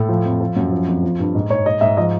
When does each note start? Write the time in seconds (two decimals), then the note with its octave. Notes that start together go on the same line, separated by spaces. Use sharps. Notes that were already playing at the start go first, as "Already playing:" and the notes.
Already playing: A2 A4
0.09 F3
0.26 F2
0.41 F3
0.56 F#2
0.72 F3
0.88 F2
1.03 F3
1.19 G2
1.35 G#2
1.50 G#2 C#5
1.66 G#2 D#5
1.81 G#2 E5
1.97 F3 D#5